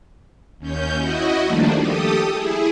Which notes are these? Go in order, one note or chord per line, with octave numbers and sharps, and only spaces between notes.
D#2 C#4 G6
E4 F#4 D#5
D#3 F3 G3 A3 A#3 D4
G4 A4 D#6
E4 G#4